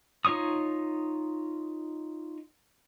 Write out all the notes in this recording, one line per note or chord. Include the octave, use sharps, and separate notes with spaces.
D#4 F4 C#5 C#6 D#6